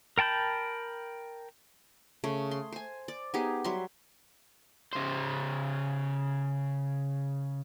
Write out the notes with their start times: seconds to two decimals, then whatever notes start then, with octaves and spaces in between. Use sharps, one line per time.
0.18 A#4 G5 A5 B5 G6
2.24 C#3 A3
2.51 C6
2.72 C5 G#5
3.08 D5
3.34 B3 D#4 G4 G#4
3.64 F#3 G3 E5 C6
4.93 C#3 C5